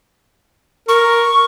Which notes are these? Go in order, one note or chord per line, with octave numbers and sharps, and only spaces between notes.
A#4 C#6